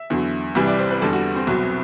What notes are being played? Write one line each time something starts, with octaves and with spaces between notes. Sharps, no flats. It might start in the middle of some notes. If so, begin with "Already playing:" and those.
Already playing: E5
E2 D3 F#3
C2 C3 E3 G3
D5
C5
B4
E2 D3 G3 A4
F#4
C4
C2 B2 F#3